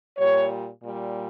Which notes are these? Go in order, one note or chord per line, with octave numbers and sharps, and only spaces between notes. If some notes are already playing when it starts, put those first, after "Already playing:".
A#2 G3 C#5
A#2 G3